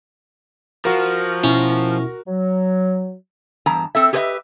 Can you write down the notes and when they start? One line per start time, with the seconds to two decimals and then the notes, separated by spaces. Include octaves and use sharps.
0.85 F3 F#4 A#4
1.44 B2 C#4 E4
2.27 F#3
3.66 E2 G2 A5 A#5
3.95 C4 A4 E5
4.13 G4 G#4 B4 C5 D#5 E5